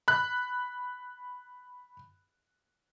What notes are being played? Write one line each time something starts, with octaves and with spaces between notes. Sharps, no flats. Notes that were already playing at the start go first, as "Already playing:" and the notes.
B5 F#6